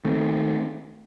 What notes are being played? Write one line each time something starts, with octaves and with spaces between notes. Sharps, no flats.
D#3 A3 C4